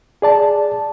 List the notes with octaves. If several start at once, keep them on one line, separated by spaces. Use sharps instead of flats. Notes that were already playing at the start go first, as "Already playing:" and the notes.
G#4 D5 A5